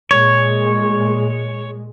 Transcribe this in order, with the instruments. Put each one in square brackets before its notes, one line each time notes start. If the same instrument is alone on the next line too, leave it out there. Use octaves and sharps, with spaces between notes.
[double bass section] A#2 G#3 [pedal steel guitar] C#5